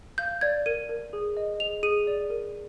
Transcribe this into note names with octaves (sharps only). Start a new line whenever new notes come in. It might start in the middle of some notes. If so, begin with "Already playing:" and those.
F5 G6
D5 G#6
A#4 D#7
A#4
G#4
D#5
G#4 F7
G#4 D#7
D5
A#4